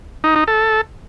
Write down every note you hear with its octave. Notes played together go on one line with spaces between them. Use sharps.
D#4
D#4
A4